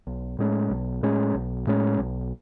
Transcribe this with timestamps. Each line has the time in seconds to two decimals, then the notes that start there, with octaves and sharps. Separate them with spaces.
0.07 B1
0.39 A2 G#3 C#4
0.71 B1
1.03 A2 G#3 C#4
1.35 B1
1.67 A2 G#3 C#4
1.99 B1